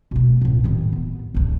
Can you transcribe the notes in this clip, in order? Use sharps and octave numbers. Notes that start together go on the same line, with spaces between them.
B2 A3
C#2 A2
A1 D#3
B3
D2 G#2